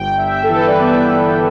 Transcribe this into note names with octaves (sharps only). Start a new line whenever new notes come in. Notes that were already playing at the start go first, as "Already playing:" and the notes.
Already playing: G1 G5
G1 E5
A4
E3
B4
D5
B3 E5
B3 G5